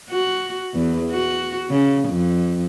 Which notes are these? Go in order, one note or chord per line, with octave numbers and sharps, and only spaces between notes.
F#4
E2
F#4
C#3
F2